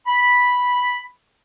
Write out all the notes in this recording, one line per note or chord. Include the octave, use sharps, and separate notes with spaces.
B5